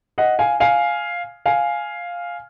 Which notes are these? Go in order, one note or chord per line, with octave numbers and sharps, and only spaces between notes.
D#5 F#5
F5 G#5
F5 G#5
F5 G#5